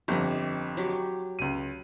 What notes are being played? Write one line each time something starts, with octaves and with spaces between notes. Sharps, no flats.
G1 F2 G4 D#5
F#3 G4
C#2 D#7